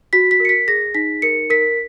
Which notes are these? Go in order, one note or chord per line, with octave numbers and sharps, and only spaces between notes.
F#4 B6
B6
A#4 C#7
B6
G#4 A#6
D#4 B6
A#4 C#7
A#4 B6